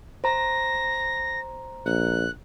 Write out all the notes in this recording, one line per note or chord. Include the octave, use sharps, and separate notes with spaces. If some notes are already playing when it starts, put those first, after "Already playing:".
C5 A#5 A#6
A#1 F#6